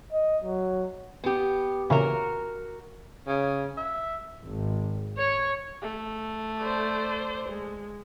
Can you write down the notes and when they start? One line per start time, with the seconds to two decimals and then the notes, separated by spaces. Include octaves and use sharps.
0.12 D#5
0.44 F#3
1.24 B3 G4
1.90 A#2 C#3 E3 F#4 A#4
3.28 C#3
3.77 E5
4.44 G#1
5.18 C#5
5.82 A3
6.59 C5 D5
7.48 G#3